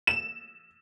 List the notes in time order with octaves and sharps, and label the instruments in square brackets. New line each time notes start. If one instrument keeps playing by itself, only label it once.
[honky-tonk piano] E7